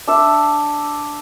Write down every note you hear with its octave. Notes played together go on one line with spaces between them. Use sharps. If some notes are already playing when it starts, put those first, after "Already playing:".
D4 E5